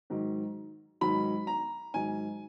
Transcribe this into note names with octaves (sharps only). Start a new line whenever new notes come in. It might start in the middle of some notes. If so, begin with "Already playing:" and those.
G#2 D#3 F#3
G#2 D#3 F#3 B5
A#5
G#2 D#3 F#3 G#5